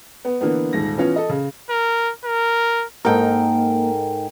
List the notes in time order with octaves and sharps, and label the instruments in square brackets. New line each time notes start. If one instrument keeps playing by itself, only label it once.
[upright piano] B3
D3 E3 A#3 B3
D#1 G#2 A#6
E3 B3 C#4 F4
A4 D#5
C#3
[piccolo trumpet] A#4
A#4
[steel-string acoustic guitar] G#2 D#4 G5 [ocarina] A#3 [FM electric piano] A4 A#4